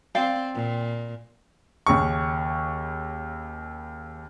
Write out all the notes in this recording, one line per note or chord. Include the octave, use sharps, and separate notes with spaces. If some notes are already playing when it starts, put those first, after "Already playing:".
C4 D5 F5 G5
A#2
D#2 C#3 C#6